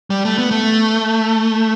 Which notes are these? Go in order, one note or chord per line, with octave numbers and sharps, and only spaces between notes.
G3
A3
B3
A3